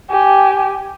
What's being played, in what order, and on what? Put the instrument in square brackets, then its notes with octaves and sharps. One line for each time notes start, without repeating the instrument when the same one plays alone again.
[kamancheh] G4 G#5